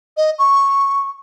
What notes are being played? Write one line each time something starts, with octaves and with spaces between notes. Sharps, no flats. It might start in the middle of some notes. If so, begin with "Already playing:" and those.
D#5
C#6